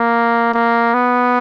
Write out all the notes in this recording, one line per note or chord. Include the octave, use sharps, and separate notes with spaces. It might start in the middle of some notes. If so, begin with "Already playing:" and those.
Already playing: A#3
A#3
B3